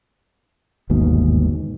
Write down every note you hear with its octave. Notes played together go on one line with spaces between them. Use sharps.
G1 D#2 G#2 B2